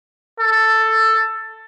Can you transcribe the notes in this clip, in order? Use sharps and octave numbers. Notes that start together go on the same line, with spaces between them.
A4